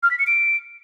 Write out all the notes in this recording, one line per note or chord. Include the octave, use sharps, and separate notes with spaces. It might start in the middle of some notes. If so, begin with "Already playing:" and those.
F6
B6
C#7
D7